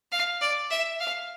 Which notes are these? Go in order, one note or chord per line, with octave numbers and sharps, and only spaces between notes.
F5
D5
E5
F5